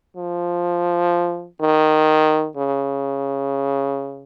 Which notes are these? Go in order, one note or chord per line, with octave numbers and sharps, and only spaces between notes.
F3
D#3
C#3